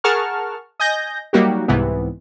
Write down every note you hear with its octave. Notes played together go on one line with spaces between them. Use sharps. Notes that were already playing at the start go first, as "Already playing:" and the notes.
G#4 A#4 F#5 A5 C#6 F6
D#5 G#5 G6 A#6
F#3 G3 A#3 D#4 F#4 G4
C2 G#2 C3 E3 B3